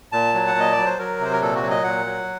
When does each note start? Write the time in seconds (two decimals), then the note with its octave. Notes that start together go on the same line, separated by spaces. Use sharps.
0.12 A#2 A5
0.34 F#3
0.47 F#5
0.55 A#2 D#5
0.72 D5
0.77 F#3
0.86 C5
0.99 F#3 A#4
1.20 C3 C5
1.33 A#4
1.41 A#2 A4
1.55 F#4
1.63 F#3
1.70 D#5
1.84 A#2 F#5
2.06 F#3